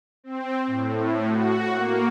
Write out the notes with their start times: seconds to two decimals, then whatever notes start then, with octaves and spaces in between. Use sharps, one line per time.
0.24 C4
0.67 A2
1.28 F#4
1.74 A#3